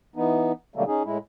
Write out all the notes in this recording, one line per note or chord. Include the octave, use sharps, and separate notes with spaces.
E3 B3 D#4
B2 D3 F#3 G3 A3 A#3
C#4 D#4 G#4
A2 G#3 E4